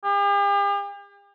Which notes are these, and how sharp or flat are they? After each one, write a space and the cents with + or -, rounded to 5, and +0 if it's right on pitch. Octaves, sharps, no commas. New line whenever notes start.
G4 +45